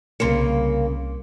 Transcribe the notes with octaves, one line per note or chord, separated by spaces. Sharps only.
C2 C#3 A#3 C6 C#7